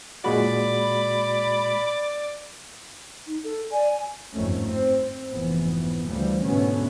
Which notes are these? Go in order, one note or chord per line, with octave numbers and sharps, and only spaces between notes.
A#2 G#3 F#4 D5 B5
D#4
A4
D5 G#5
G1 F2 G#2 D#3 A3 C#4
C4
F1 G#2 E3 B3
D2 D3 E3 F3 G3
G#2 B2 D3 A3 B3 C#4